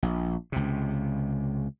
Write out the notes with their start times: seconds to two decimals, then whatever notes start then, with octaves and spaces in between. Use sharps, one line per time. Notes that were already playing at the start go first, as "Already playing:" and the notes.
0.03 A#1
0.52 C#2 C3